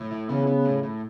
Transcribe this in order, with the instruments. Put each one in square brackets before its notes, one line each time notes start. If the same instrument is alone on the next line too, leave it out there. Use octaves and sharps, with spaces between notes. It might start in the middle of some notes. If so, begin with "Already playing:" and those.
Already playing: [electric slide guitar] A2
E4
[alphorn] C#3 [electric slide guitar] B3
[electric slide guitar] B3
A2
A2